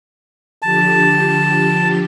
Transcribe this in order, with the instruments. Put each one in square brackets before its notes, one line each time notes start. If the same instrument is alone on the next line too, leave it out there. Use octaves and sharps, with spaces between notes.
[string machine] D3 F3 G4 [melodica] A5